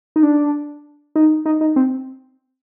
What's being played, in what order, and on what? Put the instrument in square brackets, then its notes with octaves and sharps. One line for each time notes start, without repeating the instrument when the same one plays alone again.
[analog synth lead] D#4
D4
D#4
D#4
D#4
C4